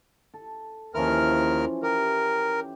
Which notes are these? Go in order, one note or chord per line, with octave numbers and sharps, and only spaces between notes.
A4
D#2 E3 F3 C#4 A#4 F6
G4 A#4